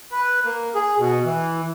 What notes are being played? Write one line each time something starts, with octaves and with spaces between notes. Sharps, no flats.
B4
A#3
G#4
B2
E3